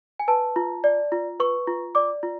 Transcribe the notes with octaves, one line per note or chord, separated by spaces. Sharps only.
G#5
B4 A5
F4
D5
F4
B4 C#6
F4
D5 D6
F4